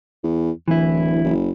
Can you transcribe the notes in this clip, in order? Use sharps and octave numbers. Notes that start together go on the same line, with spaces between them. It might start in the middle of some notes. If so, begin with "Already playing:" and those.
E2
D1 E3 E4
F#1